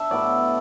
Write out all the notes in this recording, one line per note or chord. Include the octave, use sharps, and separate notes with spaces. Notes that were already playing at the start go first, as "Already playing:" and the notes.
Already playing: D4 E5
A2 F#3 B3 E4 D5